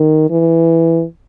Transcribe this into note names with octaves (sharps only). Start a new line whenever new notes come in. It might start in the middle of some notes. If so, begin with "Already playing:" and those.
Already playing: D#3
E3